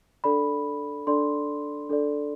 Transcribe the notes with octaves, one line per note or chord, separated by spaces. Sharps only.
D4 A4 D5 B5
D4 A4 D5 C6
D4 A4 D5